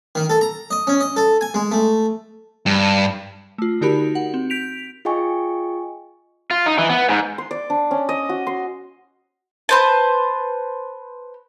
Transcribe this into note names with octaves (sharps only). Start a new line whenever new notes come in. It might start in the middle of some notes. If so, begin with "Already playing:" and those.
D#3
A4
A#5
D#5
C#4
D#5
A4
G#5
G#3
A3
G2
A3 F4
D3 D#4 F#4 G4 A#4 B5
F#5
C4
G6 B6 D7 F7
F4 G#4 D#5 G5 G#5 C#6
F4
D#4
E3
B3
G#2
C6
D5
D4
C#4
D#5
F#4
C6
B4 C5 A5